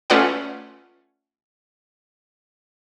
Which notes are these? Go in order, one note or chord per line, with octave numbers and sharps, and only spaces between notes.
A3 C#4 F4 B4 D5 F#5